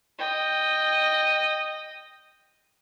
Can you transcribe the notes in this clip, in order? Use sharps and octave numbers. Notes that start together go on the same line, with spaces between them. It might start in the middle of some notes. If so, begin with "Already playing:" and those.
D#5 G5